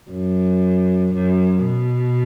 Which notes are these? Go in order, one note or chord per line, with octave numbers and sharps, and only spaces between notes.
F#2
F#2
B2